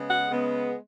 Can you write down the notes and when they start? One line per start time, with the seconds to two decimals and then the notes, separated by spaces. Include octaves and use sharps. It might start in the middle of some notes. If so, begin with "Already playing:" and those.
Already playing: C#3 G#3 B3
0.10 F#5
0.30 C#3 G#3 B3